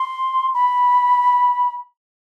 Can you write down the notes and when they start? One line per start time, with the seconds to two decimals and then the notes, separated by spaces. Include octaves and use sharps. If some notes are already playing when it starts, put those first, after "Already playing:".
Already playing: C6
0.54 B5